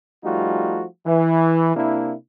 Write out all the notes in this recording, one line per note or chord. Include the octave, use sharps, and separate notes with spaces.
F3 G3 A3 D#4 F4 F#4
E3
C3 A#3 D4 E4